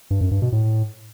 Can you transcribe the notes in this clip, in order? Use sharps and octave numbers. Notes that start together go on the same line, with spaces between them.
G2
F#2
G2
B2
A2